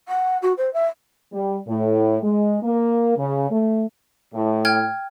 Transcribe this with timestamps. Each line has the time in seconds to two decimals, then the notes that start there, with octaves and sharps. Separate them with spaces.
0.08 F#5
0.42 F#4
0.57 C5
0.73 E5
1.33 G3
1.68 A2
2.23 G#3
2.63 A#3
3.18 C#3
3.51 A3
4.34 A2
4.65 G5 F6 G#6